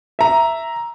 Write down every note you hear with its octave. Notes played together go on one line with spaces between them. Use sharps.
E5 A#5